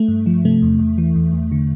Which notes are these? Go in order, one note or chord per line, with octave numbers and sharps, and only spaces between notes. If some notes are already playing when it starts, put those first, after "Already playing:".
Already playing: A3
G2
F3
C3 A3
E2
E2
E3
E2
E2
D3